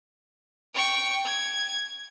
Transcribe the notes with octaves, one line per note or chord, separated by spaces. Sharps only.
G5 C#6
G#6